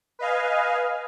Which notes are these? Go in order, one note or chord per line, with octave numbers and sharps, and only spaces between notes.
B4 D#5 F5 G#5